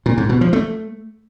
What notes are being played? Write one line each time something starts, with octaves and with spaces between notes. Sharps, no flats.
A#2
G#2
B2
F3
A3